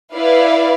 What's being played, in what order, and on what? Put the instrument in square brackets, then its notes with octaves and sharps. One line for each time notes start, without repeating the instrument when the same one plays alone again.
[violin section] E4 B4 D5 F5